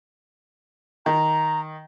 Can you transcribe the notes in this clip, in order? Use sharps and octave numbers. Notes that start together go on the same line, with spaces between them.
D#3 A#5